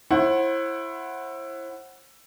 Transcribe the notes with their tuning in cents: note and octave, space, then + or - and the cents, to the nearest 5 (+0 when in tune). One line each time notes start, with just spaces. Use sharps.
E4 +15 C5 +40 F#5 +0